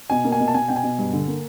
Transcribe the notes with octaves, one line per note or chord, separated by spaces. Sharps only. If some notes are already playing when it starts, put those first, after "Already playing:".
B2 G#5
A#3
G#5
B2
A5
B2 G#5
B2 G5
G#5
B2
G2
D3
A#3